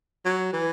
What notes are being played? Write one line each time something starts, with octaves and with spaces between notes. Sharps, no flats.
F#3
E3